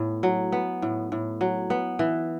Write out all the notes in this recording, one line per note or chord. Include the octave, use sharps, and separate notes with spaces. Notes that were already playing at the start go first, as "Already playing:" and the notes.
Already playing: A2 B3
F#3
B3
A2
A2
F#3
B3
E3